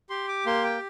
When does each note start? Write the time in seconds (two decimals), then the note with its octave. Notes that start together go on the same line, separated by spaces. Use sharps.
0.10 G4 C6
0.28 D6
0.46 A#3 C6
0.64 G5